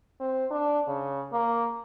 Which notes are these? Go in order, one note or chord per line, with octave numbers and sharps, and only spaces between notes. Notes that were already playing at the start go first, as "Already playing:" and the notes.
C4
D4
C#3
A#3